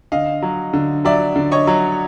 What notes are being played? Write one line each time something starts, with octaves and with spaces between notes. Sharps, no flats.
D3 D#5 F5
F#3
D3
F#3 D5 E5
D3
C#5 D#5
F#3